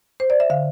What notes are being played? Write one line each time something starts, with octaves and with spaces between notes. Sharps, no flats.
C5
D5
E5
D3 F5